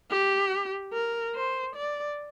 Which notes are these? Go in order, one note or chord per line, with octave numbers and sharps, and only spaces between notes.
G4
A#4
C5
D5